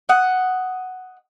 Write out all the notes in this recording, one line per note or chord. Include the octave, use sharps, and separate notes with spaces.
D#5 F#5